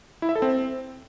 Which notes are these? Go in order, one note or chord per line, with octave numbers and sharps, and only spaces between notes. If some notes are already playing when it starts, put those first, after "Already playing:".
E4
E5
A4
C4